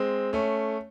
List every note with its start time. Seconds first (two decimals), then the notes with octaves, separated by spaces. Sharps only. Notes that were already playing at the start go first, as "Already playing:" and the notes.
Already playing: G#3 C4
0.33 A3 C#4